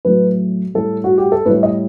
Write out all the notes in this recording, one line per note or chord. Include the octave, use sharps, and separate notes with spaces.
A2 F#3 A3 B4
A2 G3 A4
F#4
G4
A4
A2 G3 B4
D#5